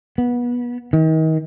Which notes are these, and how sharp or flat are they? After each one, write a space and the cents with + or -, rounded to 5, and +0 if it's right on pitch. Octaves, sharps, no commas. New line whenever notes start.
B3 -25
D#3 +35